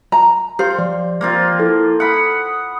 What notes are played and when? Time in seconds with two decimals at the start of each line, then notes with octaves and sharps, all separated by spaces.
0.12 A#5
0.59 G4 C5 F5 C6 F6
0.79 F3 D5
1.21 F3 A#3 C4 F4
1.59 E4 A4
2.00 F#5 B5 D#6